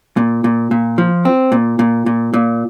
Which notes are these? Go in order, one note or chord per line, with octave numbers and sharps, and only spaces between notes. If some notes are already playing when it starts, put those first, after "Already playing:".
A#2
A#2
A#2
F3
C4
A#2
A#2
A#2
A#2